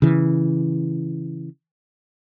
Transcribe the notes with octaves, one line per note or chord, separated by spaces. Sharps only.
C#3 E3